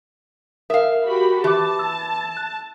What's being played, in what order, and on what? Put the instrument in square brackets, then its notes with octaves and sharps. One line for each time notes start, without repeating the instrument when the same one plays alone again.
[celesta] A#4 [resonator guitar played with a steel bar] E5 F5
[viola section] F#4 G4 B5
[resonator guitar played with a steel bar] E3 [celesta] G4 D6 [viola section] A5
[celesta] E6
F#6